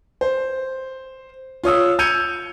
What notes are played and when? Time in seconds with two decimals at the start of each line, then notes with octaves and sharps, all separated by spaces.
0.21 C5
1.64 F4 C#5 D#6 E6
1.99 E6 G6 G#6 C#7 D#7 F7